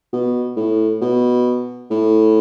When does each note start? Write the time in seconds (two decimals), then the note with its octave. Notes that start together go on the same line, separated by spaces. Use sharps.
0.13 B2
0.56 A2
1.02 B2
1.90 A2